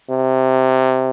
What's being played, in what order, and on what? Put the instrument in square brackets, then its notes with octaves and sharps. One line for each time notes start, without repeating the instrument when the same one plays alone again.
[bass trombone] C3